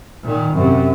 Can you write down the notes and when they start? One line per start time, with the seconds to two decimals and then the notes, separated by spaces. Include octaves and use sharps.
0.23 A#2 D#3
0.54 F#2 C3